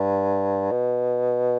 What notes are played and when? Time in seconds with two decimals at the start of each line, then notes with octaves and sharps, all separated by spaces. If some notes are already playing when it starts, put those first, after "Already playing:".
Already playing: G2
0.71 B2